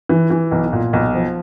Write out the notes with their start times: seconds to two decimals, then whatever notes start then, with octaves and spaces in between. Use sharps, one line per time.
0.09 E3
0.30 E3
0.51 B1
0.73 A#2
0.93 B1
1.14 F3